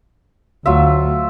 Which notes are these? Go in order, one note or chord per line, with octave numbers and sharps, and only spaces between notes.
D2 F#3 F4 E5